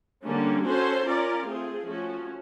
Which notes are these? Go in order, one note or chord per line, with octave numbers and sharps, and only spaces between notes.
D3 G3 A#3 C#4
C#4 F#4 A4 C5
C#4 F4 A#4 D5
A3 C4 F4 G#4
F3 A3 C#4 F#4